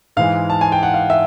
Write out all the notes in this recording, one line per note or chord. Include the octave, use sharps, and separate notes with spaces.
G#2 E3 G#3 F5
A5
G#5
G5
F#5
F5
E5